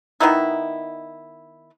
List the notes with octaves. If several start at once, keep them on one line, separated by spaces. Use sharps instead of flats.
D#3 F#3 B3 D#4 E4